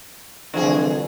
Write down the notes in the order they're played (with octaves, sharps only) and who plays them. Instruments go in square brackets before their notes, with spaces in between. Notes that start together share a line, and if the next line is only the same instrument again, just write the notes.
[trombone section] C2 E3 F3 [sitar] D3 G#4